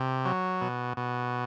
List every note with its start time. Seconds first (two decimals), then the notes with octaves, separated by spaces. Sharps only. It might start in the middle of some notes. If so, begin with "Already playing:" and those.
Already playing: C3
0.25 F#3
0.61 B2
0.97 B2